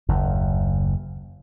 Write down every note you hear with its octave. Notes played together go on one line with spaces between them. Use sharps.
F#1 D#2